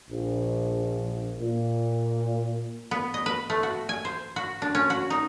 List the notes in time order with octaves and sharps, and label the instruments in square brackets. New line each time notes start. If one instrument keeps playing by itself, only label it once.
[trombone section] A#1
A#2
[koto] B3
D#5
B4
A3
F#4
G#5
C5
F#4
D4
C#4
F#4
D#4